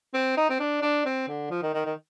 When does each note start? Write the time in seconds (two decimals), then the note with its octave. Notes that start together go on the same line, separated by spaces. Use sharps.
0.14 C4
0.37 D#4
0.50 C4
0.60 D4
0.82 D4
1.05 C4
1.28 D3
1.51 F3
1.63 D#3
1.74 D#3
1.85 D#3